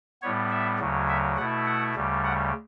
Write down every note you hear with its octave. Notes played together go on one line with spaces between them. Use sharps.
A2 G3 B3 C#5
E5
D2 C#3 F#3
E5
B2 A3 E4 F#5
F#5
D2 C#3 G3
F#5